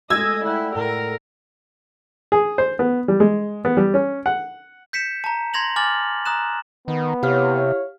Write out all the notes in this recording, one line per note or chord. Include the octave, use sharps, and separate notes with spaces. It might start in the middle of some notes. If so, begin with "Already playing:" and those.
G#3 A3 F4 D#5 E6 G#6
E4 D5 F#5 G5
A2 A4 A#4
G#4
C5
B3
G3
G#3
B3
G3
C#4
F#5
G6 B6 C#7 E7
A5 A#5
C6 G#6 A#6 F7 F#7
G#5 D6 F6 A6 F#7
A#5 D#6 F#6 E7
D#3 B3
C3 E4 G4 C#5 F5 F6